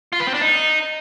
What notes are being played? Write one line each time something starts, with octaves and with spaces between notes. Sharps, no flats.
F4
B4
C4
D4
D#4